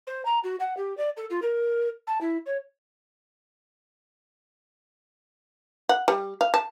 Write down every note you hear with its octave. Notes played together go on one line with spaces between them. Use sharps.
C5
A#5
F#4
F#5
G4
D5
A4
F4
A#4
A5
E4
C#5
F#5
G3
F5
A5